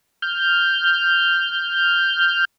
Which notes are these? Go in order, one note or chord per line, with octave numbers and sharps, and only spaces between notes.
F6 G6